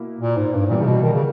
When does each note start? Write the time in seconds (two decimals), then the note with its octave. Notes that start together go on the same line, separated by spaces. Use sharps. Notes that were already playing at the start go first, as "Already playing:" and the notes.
Already playing: B2 A#3 E4
0.21 A#2
0.37 G#2
0.53 G2
0.66 G#2
0.70 A#2 E3 G3 B3
0.82 C#3
0.86 B2
1.03 D#3
1.13 C#3